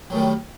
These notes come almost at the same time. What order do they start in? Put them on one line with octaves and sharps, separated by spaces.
F#3 A2 D#3 G3